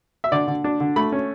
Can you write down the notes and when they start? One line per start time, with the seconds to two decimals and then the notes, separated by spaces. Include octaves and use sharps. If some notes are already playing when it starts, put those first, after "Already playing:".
0.24 E5
0.32 D3 D5
0.48 D3
0.64 D4
0.80 D3
0.96 A3 B5
1.12 C#4